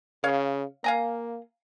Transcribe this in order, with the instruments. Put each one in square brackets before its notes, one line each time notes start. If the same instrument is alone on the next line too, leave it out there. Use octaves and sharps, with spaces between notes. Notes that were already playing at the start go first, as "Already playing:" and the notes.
[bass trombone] C#3 [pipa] C#5 F5
[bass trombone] A#3 [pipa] F5 G#5 A#5